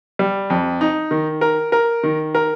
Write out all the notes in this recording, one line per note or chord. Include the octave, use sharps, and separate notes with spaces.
G3
F2
D#4
D#3
A#4
A#4
D#3
A#4